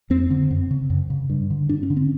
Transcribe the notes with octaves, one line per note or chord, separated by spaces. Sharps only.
F2 C4
D3
F#2
C#3
F#2
C#3
G2
D3
G2 D4
C#4
D3
C4